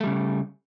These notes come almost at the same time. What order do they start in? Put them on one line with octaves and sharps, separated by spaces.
A3 G3 C#3